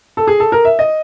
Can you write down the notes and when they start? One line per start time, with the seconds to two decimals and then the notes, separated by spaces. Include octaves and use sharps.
0.17 A4
0.27 G#4
0.40 A4
0.52 A#4
0.65 E5
0.79 D#5